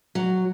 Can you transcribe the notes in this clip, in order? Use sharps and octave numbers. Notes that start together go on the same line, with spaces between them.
F#3